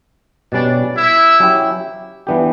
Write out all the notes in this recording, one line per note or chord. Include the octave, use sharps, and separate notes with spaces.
B2 G3 C#4 D4 D5
E4 E5
F#3 C#4 E4 G4
E3 G3 B3 D4 G4